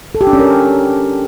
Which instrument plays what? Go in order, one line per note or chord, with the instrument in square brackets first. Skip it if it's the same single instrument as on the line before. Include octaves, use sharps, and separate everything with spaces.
[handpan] A4
G4
D4
C#4
A#4